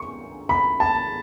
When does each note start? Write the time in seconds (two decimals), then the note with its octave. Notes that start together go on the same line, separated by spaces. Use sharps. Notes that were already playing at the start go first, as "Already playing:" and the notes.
Already playing: C#6
0.49 B5
0.80 A5